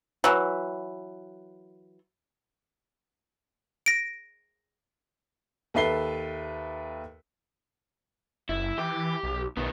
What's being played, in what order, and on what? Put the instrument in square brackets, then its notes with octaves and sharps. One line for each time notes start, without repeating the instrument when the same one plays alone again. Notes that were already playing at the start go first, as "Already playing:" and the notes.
[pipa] E3 F#3
[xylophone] A#6 D7
[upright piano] D#2 A4 B4 E5 C7 G7
[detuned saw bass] F#1 [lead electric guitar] E4
[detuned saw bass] E3 [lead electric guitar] G4
[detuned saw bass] B1
[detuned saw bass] B1 [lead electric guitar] D#3 B3